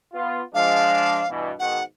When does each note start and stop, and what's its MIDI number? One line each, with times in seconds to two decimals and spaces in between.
0.13 0.40 59
0.13 0.40 65
0.54 1.21 53
0.54 1.21 56
0.54 1.21 62
0.54 1.28 77
1.30 1.51 43
1.30 1.51 47
1.30 1.51 52
1.59 1.80 44
1.59 1.80 47
1.59 1.80 51
1.59 1.84 78